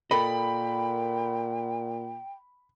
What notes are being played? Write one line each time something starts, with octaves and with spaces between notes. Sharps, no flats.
A#2 A4 A#4 D#5 G5 B5